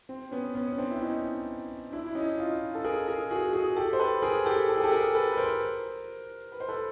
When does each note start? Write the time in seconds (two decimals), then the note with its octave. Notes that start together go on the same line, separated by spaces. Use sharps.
0.09 C4
0.31 B3 C#4
0.55 B3 C#4
0.72 C#4
0.78 C4 D4
0.91 E4
1.01 C#4 D#4
1.92 D4 E4
2.06 E4
2.15 C#4 D#4
2.38 D#4 F4
2.75 A4
2.84 G#4 A#4
3.08 G#4 A#4
3.30 F#4 G#4
3.53 F#4 G#4
3.76 G4 A4
3.93 C5
3.99 A4 B4
4.22 G#4 A#4
4.45 G4 A4
4.69 A4
4.76 G#4
4.83 G4 A4
4.91 G#4 A#4
5.14 A4 B4
5.33 B4
5.37 A#4 C5
6.52 B4
6.60 C5
6.68 A4 B4